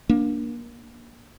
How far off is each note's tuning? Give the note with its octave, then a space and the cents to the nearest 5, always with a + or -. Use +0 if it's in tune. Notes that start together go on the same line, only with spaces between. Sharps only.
A#3 +20 D4 +0